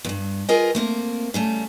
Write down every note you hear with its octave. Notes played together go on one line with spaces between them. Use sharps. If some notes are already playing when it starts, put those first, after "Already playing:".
E2 G2
F4 G#4 A#4 B4 D#5 G5
A3 A#3 C4
C#3 G3 A3